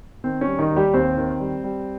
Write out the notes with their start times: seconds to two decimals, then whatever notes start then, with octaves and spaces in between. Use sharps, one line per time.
0.24 D#3 C4
0.41 C#4
0.47 G3
0.59 D#3 D#4
0.71 D#2
0.76 G3 G4
0.93 D#2 C4 C5
1.17 D#3
1.40 G3
1.64 G3